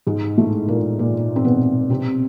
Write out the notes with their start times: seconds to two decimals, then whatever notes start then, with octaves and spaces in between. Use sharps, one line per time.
0.07 G#2 G#3
0.37 A2 A3
0.68 A#2 A#3
0.99 A#2 A#3
1.36 C4
1.44 B2 B3
1.90 C3 C4